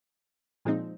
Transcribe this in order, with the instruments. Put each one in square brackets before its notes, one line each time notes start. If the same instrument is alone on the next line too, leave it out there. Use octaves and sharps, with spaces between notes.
[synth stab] A#2 F3 G#3 C4 D#4